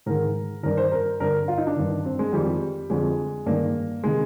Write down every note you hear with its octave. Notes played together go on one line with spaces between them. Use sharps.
G#2 D#3 A#4
G2 D#3 A#4
C5
A#4
G2 D3 A#4
F4
D#4
D4
G2 D#3
C4
G#3
F2 D#3 G3
F2 D3 G#3
G2 D#3 A#3
C3 D#3 G#3